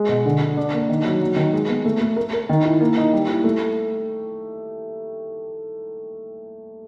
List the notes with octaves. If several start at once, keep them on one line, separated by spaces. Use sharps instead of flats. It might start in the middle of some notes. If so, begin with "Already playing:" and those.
Already playing: G#3
B2
D3
D3
D4
A#3
D#3
F#3
F#3
D#3
G#3
B3
A3
A3
A#4
A#4
D#3
E4
A#3
D#4
G3
E4
A3